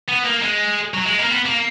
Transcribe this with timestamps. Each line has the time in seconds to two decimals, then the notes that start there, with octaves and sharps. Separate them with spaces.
0.08 B3
0.24 A#3
0.42 G#3
0.94 F#3
1.06 G#3
1.18 A#3
1.31 B3
1.45 A#3